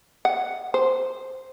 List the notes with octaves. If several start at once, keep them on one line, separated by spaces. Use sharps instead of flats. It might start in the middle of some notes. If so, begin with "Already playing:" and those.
F#5
C5